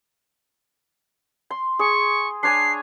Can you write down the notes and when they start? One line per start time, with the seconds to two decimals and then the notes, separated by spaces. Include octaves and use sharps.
1.51 C6
1.79 G#4 C6 C#6
2.43 D4 C#5 G#5 C7